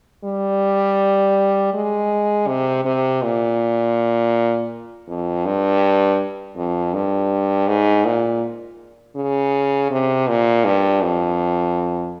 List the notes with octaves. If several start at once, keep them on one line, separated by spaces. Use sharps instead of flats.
G3
G#3
C3
C3
A#2
F2
G2
F2
G2
G#2
A#2
C#3
C3
A#2
G2
F2